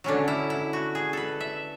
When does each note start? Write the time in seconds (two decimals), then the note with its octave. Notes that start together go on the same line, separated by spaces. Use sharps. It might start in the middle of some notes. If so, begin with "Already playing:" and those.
0.04 D3 F#3 C#4 D4
0.28 E4
0.50 E4
0.73 F#4
0.95 G#4
1.13 A4 B4
1.40 E5